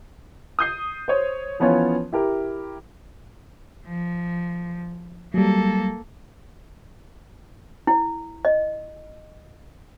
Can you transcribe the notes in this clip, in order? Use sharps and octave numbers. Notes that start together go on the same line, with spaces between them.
D#6 G6 C7
C5 C#5
E3 F3 B3 C#4 F4 C#5
E4 G4 A#4
F3
F#3 G3 A#3 A4
E4
D#5